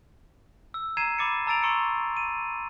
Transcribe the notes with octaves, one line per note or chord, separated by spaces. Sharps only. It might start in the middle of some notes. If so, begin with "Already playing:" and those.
E6
A#5 G#6 C7 D#7 E7
B5 D6 A6 C#7
A5 A#5 E6 A6 D7 F7
A#5 C6 C#6 E6 C#7 D7
D#7